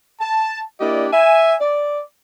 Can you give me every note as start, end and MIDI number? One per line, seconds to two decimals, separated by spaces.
0.20 0.61 81
0.81 1.07 58
0.81 1.07 62
0.81 1.07 64
0.81 1.07 67
0.81 1.07 74
0.81 1.07 75
1.13 1.53 76
1.13 1.53 80
1.61 2.00 74